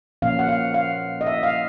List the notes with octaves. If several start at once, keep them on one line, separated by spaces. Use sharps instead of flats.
A#2 F3 A#3 C#4 F5
F#5
F5
F5
D#5
E5
F5